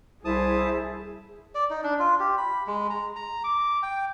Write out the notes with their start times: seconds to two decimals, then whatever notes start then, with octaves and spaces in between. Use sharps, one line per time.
0.25 C2 E4 G#4 C5 E5 A5 D#6
1.55 D5
1.70 D#4
1.84 D4
1.99 F4
2.20 G4
2.38 B5
2.67 G#3
2.90 A#5
3.16 A#5
3.44 D6
3.83 G5